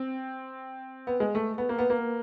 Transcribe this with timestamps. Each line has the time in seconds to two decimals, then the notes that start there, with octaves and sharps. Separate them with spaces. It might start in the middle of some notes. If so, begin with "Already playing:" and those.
Already playing: C4
1.07 B3
1.20 G#3
1.35 A3
1.58 B3
1.69 A#3
1.78 B3
1.90 A#3